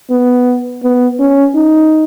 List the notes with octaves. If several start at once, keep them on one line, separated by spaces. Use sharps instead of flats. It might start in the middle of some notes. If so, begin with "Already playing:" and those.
B3
B3
C#4
D#4